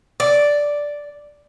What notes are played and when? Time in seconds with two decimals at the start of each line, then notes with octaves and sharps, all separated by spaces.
0.20 D5